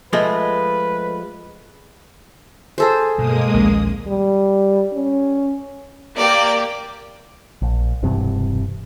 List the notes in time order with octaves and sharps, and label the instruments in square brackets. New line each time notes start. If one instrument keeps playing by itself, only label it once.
[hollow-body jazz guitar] F3 G#3 A3 [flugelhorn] B4
[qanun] G#4 A4 C5
[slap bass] G2 B2 [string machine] G#3 A#3 D#6
[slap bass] A#1 D#2 C#4
[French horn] G3
C#4
[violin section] A#3 G4 [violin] D5
[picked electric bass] A#1
E1 E2 G2 C3